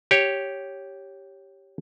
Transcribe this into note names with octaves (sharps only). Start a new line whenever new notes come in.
G4 C#5